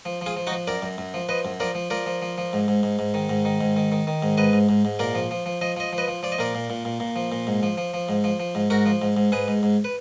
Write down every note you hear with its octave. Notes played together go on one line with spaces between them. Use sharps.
F3
F3 F4 G#4
F3
D#4 F#4
F3
F#2 A#4 D5
F#2
F#2
F3
F3 B4 D#5
F#2
F3 A#4 D5
F3
F3 A#4 D5
F3
F3
F3
G#2
G#2
G#2
G#2
D#3
G#2
D#3
G#2
D#3
D#3
D#3
G#2
G#2 B4 D#5
G#2
G#2
G#2
A#2 A#4 D5
F3
F3
F3
F3 D#5
F3 D#5
F3
B4 D#5
F3
F3 D5
D#5
A#2 A#4 D5
A#2
A#2
A#2
A#2
F3
A#2
G#2
F3
F3
F3
G#2
F3
F3
G#2
G#2 F#4 A#4
F3
G#2
G#2
G#2 G#4 B4
G#2
G#2
B4